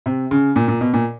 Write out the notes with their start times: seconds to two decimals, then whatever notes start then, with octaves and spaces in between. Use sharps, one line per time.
0.06 C3
0.31 C#3
0.56 A#2
0.68 A#2
0.81 B2
0.93 A#2